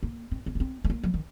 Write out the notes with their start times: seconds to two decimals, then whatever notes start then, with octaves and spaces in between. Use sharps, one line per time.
0.03 A#3
0.31 C4
0.46 C4
0.55 B3
0.60 C4
0.84 A3
0.90 A#3
1.03 F#3
1.14 D#3